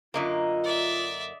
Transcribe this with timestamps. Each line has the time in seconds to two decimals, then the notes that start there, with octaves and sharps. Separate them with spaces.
0.14 F#2 D3 A#3 F4 D#5
0.64 D5 E5